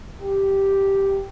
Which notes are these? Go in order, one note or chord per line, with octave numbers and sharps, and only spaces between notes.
G4